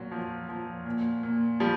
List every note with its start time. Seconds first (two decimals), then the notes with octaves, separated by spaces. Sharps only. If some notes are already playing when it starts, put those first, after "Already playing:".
Already playing: A#2 F#3
0.11 F3
0.49 F3
0.86 A#2
1.23 A#2
1.60 F3 G3